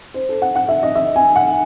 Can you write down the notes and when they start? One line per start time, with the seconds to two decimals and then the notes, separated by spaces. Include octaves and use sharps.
0.14 C5
0.29 A4
0.42 F#5
0.55 F#5
0.69 E5
0.83 D#5
0.95 E5
1.16 G#5
1.36 F#5